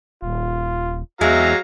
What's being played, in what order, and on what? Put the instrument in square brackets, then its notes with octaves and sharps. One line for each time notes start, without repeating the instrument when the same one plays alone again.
[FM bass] D#1 [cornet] F4
[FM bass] E2 [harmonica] F#3 F5 A#5 [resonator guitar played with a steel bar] G#3 [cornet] E5